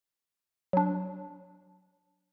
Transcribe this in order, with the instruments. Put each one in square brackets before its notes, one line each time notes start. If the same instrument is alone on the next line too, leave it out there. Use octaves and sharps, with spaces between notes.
[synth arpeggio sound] F#3 D4